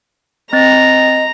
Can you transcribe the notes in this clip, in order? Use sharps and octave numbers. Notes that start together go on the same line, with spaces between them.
C4 D#5 A#5 A6